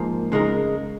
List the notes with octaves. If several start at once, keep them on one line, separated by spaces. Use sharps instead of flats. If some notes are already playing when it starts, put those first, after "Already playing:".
Already playing: G#2 F3 A#3
C#3 G#3 D#4 A#4